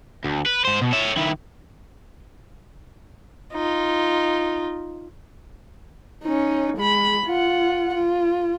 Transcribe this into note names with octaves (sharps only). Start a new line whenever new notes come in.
D2
B4
G#2 C5
B2
C#5 E5
D#3 E4
D#4 F4
C#4 D#4
G#3 B5
F4 F#5
F4